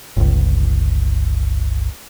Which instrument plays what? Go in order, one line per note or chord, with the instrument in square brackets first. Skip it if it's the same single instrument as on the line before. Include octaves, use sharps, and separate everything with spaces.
[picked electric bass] G1 C#2